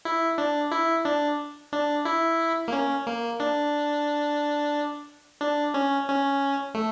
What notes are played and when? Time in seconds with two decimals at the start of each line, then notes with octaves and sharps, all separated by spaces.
0.05 E4
0.38 D4
0.72 E4
1.05 D4
1.73 D4
2.05 E4
2.68 A#3
2.72 C#4
3.07 A#3
3.40 D4
5.41 D4
5.74 C#4
6.08 C#4
6.74 A3